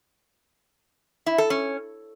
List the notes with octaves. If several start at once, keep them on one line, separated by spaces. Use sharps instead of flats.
E4
A4
C#4